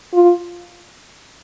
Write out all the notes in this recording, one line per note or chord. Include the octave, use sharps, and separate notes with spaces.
F4